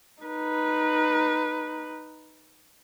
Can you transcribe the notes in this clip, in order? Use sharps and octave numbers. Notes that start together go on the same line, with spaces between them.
D#4 B4